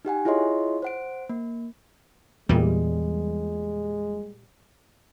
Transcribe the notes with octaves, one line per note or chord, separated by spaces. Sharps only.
D#4 G4 F#5 G#5
E4 F4 G#4 C#5 D#5 C6
C5 F#5 D7
A#3
E2 A#2 E3 G3 G#3